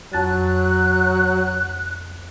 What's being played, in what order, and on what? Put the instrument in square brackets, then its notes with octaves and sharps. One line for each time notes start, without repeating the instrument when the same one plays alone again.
[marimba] F2 A6 [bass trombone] F#3 [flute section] F#6